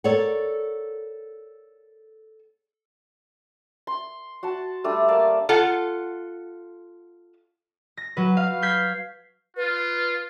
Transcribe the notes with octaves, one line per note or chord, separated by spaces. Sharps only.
A4 A#4 C#5 D5 F#5
C6
F#4 F#5 A5
G3 A3 D4
A#3 D5 E5 F5
F4 A4 F#5
A#6
F#3 B4
F5
G6 G#6 B6 C7
F4 B4